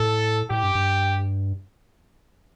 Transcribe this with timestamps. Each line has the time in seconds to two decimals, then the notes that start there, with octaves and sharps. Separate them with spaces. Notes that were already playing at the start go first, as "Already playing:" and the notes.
Already playing: A2 A4
0.50 A2 G4
0.63 G2
0.75 G2